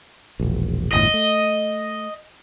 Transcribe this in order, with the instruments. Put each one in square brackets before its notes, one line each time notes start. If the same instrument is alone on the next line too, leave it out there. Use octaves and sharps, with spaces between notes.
[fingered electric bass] E1 A#1
[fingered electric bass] G1 E2 A2 [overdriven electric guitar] D#5
[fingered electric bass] A3